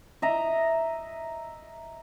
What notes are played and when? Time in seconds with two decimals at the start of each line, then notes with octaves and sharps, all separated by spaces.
0.22 D#5 E5 A#5